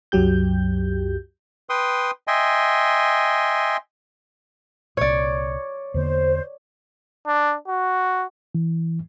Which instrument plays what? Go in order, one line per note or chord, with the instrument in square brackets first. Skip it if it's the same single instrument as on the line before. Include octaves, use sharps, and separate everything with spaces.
[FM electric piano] C2 F#2 F#3 G4 G6
[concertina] B4 G5 C6 D#6
D#5 E5 G5 G#5 C6
[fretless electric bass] C2 A#2 [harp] C#5 D5
[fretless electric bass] E2 D3 A#3 [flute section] C5
[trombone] D4
F#4
[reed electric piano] E3